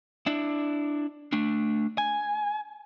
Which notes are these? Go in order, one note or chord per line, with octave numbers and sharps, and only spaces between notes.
D4 E4
A3 D4
G#5